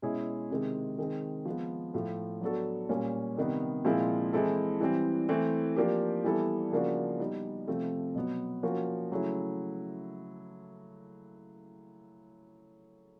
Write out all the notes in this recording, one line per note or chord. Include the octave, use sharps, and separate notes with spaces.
B2 G#3 C#4 E4 G#4
C3 D#3 G#3 C4
D#3 G#3 C4
F3 G#3 B3
A2 F3 A3
F#3 B3 D4 F#4 A4
A#2 G3 A#3 C#4
C3 D#3 G3 B3
A#2 F3 G#3 C4 E4
E3 G#3 C4 E4 A4
E3 G3 C4
E3 A3 C4
F3 A#3 D4 G4
E3 G3 B3 E4 A4
C#3 F3 A#3 D4 F#4
G3 B3 D#4
C3 F3 A3 C4
B2 F#3 B3
F3 A#3 C#4 F#4
C#3 F#3 A3 C#4 E4